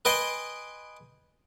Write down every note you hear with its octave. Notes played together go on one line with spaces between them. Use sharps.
B4 D#5 G5 G#5 C6